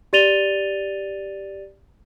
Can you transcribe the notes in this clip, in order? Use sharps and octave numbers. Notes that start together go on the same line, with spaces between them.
G4 D5 A6 D#7 F7 G7